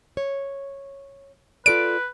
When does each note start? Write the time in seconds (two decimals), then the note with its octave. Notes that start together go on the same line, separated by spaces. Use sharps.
0.17 C#5
1.66 F4 A4 B4 D5 D7